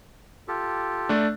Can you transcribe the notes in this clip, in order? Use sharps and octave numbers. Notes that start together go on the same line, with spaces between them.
F4 G4 A4
A3 D4